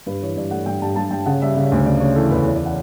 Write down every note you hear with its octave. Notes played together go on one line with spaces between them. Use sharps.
G2 B4
E3 C#5
G2 D5
A3 F#5
G2 G5
G2 A5
G2 A5
G2 G5
C#3 F#5
G3 E5
C#3
D2
C#3 D5
C#3 C#5
E3 A4
E2 B4
E3 C#5
D5
E3 F#5